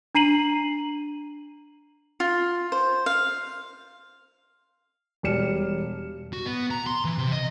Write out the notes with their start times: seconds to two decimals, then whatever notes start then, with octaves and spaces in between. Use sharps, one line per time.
0.15 D4 A#5 C7 D#7 F#7
2.20 F4
2.72 C5
3.06 F5
5.23 E1 G3 D5 F6 C#7 E7
6.33 F#4
6.46 B3
6.71 A#5
6.87 C6
7.05 E3
7.18 C3
7.32 D#5